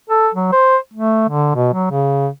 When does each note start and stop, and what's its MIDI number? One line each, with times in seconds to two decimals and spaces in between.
0.10 0.29 69
0.35 0.51 54
0.52 0.77 72
0.94 1.28 57
1.29 1.53 50
1.55 1.72 47
1.74 1.90 54
1.91 2.28 49